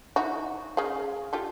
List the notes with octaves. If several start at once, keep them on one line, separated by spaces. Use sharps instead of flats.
D#4 E4 F#4
C#3 G#4 F5
F4 G4 A4